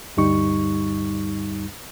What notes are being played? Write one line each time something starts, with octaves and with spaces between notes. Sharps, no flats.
D2 G2 G3 D#4 C#6